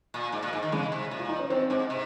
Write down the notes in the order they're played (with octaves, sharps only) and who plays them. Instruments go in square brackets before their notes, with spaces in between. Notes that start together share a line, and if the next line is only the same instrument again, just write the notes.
[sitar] A#2
G#2
A#2
G#2
D#3
[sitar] C#3 [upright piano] G#3
[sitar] C3
A#2
[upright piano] F4
D#4
C#4
[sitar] G2 [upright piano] C4
[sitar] G#2
C3